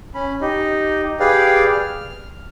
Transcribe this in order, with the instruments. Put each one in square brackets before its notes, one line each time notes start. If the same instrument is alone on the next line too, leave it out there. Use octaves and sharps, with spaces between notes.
[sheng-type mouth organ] C#4 B5
D#4 G4 D#5
G4 G#4 B4 D5 F5 G5
F6